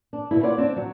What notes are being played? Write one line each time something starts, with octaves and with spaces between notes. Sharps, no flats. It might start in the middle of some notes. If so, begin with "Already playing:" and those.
D4
B2 D3 E4
F4 C#5 D5 F#5
C4 D4
F#3